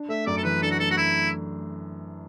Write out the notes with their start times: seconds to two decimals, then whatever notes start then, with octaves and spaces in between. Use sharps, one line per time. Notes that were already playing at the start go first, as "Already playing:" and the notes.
Already playing: D4
0.09 A3 E5
0.26 F#2 D5
0.37 A4
0.44 E3 B4
0.62 D4 A4
0.71 F#4
0.79 A3 A4
0.91 F#4
0.97 E4